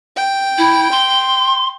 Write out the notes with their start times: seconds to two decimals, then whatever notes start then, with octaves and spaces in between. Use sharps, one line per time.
0.16 G5
0.58 E4
0.91 C6